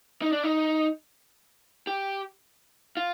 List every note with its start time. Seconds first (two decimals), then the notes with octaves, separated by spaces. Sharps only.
0.22 D#4
0.32 D4
0.43 D#4
1.87 G4
2.97 F4